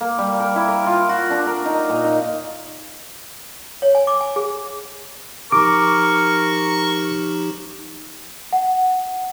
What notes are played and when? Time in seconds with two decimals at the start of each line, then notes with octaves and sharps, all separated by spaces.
0.01 A#3
0.18 G3
0.40 A#4
0.56 E4
0.68 A#4
0.86 F4
1.09 F#4
1.30 D4
1.47 A#4
1.65 D#4
1.89 A#2
2.05 D#4
3.82 C#5
3.95 G#5
4.07 D6
4.21 G#5
4.36 G#4
5.52 F3 D#4 G4 A#4 C#6 D6
8.53 F#5